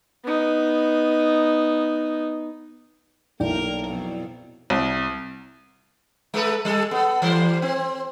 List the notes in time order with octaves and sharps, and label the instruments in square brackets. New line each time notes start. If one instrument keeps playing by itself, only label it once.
[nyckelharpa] B3 D#4
[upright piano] B1 [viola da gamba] A#3 A#4 [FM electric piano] E4 D5 G5
[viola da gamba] F2 B2 F#3
[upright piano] C2
[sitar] G#3 A4 B4
G3 A4
B3 A4
E3 G3 C5
C4